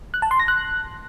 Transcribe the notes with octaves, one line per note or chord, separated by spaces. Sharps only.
F#6
A5
C6
A#6
F#6